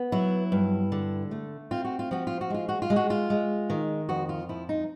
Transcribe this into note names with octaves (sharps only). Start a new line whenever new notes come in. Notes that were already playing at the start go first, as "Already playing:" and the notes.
Already playing: B3
F#3 E4
G2
D3
A3
C4 F4
F#4
F4
F3 F#4
F4
F#4
G#3 F4
F#4
F4
G#3
F#4
F4
G#3
D#3
F2 F#4
F4
F3 E4
D#4